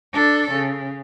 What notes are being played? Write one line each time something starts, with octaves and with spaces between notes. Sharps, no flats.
D4 A4
C#3